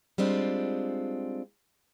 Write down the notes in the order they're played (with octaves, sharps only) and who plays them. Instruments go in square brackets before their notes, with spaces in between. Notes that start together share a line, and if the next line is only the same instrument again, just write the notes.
[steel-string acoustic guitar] G3 G#3 C4 D4 F4